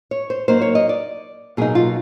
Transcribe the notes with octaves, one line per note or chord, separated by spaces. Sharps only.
C#5
C5
F#3 A#3 D#4 C5
C#5
D#5
D5
B2 F#3 A#3 D#4 G#4
F4